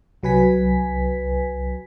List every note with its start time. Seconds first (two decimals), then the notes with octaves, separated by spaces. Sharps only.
0.23 C2 F#3 B4 G#5 B6